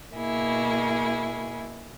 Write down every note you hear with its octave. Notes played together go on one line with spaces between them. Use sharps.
B2 A#3 E4 G#4